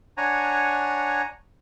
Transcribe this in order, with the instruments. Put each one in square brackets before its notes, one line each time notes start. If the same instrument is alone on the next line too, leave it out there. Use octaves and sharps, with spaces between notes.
[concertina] D4 C#5 F#5 G#5 A#5